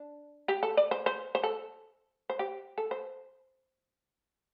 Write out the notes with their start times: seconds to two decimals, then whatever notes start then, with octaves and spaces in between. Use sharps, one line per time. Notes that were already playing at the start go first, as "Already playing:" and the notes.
Already playing: D4
0.48 G4
0.63 A4
0.77 D5
0.91 C5
1.06 C5
1.35 C5
1.43 A4
2.30 C5
2.39 G4
2.78 A4
2.91 C5